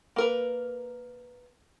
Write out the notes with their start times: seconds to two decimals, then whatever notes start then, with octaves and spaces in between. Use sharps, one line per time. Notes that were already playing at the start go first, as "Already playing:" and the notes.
0.16 A#3 A#4 B4